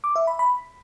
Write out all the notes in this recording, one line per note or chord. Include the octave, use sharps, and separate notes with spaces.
D6
E5
B5
B5